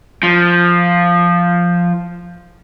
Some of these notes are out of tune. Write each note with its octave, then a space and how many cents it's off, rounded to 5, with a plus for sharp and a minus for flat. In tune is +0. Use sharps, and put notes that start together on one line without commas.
F3 +0